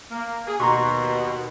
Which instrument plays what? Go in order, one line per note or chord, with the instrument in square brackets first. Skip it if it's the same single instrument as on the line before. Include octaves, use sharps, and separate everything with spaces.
[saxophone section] A#3
G#4
[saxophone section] D#2 B2 [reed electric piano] A#5 C6 C#6